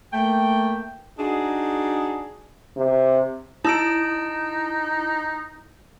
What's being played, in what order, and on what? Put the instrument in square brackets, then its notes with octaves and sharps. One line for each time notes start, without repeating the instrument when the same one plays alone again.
[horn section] A3 A#3 G5
D4 D#4 F#4 G#4
[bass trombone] C3
[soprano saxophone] D#4 [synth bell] E4 [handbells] A5 E6 D7